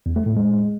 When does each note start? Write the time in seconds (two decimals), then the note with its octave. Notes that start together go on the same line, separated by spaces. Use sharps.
0.06 E2
0.16 A3
0.26 A2
0.36 G#3